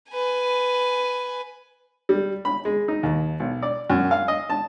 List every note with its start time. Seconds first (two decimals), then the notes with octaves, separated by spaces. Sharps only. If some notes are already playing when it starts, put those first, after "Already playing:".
0.10 B4 G#5
2.09 G3
2.45 B5
2.65 G#3
2.88 D#4
3.03 D#2
3.40 B1
3.63 D5
3.90 F#2
4.11 F5
4.28 D#5
4.49 A5